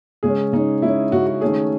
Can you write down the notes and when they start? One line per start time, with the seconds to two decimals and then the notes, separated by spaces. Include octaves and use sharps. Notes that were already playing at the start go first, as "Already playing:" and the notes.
0.23 C#3 G#3 C#4 G#4
0.53 C#3 G#3 C#4 D#4
0.82 C#3 G#3 C#4 E4
1.12 C#3 G#3 C#4 F#4
1.27 F#4
1.41 D#3 A3 C#4 G#4